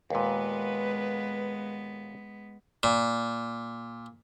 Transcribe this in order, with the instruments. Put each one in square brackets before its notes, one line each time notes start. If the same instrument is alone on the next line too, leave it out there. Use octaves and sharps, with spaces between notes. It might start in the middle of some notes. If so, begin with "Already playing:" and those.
[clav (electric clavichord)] D#2 A#2 [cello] G#3 B3 [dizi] B4
[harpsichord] A#2